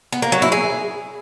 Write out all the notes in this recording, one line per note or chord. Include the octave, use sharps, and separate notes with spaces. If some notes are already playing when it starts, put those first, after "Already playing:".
B3
A#3
F#3
E4
G#4